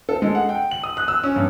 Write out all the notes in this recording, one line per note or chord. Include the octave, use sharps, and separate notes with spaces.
A4
G#3
F#5
G5
F#7
D#6
F#6
E6
C#4
G2